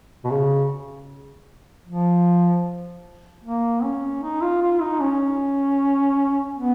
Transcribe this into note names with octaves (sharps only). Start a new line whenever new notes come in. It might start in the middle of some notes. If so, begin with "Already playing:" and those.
B2
C#3
F3
A#3
C#4
D#4
F4
F4
D#4
C#4
B3